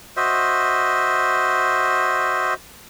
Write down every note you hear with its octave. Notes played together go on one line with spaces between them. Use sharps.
F#4 C5 D#5 E5